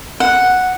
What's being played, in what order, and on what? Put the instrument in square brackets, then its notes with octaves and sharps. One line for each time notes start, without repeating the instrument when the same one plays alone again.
[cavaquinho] F#5